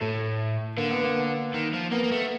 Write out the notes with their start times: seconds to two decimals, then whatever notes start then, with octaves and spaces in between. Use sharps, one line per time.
0.01 A2 A3
0.77 D3 A#3
0.91 B3
1.03 A#3
1.54 D#3
1.73 F3
1.92 A#3 B3
2.04 A#3
2.12 A3